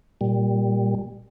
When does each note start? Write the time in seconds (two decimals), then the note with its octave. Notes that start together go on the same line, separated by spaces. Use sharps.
0.21 A#2 G3